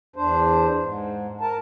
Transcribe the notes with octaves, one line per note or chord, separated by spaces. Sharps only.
E2 D4 C5
G#2
A#4 A5